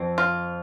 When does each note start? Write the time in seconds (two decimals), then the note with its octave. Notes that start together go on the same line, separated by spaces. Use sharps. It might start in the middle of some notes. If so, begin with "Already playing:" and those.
Already playing: F2 C4
0.18 F4